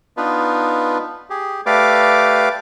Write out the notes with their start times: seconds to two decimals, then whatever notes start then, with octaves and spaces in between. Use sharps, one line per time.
0.17 B3 D4 D#4 F4 B4
1.30 G4 G#4
1.66 A3 G4 B4 D5 F5 D6